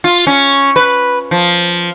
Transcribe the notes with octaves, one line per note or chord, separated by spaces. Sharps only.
F4
C#4
B4
F3